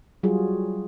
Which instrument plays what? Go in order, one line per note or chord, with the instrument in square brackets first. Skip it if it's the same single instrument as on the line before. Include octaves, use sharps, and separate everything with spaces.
[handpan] F#3 G3 F4 F#4 G#4